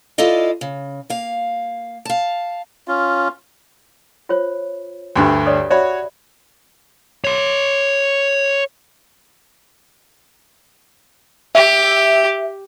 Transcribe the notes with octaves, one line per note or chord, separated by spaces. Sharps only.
E4 F4 A4 D5 D#5 F5
C#3
A#3 F5
F5 A5
C#4 F4
F4 C5 C#5
D2 G2 D3 F#4 G4 B5
C#5 D5 D#6
F#4 C#5 D5 E5 B5
C#5 C6
G4 E5